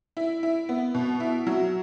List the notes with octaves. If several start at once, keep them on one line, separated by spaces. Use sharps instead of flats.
E4
E4
B3
B2
E4
F#3